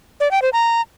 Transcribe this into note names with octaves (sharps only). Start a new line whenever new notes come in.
D5
G5
C5
A#5